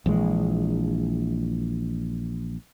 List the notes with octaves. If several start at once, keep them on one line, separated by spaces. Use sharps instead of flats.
A#1 E3 G#3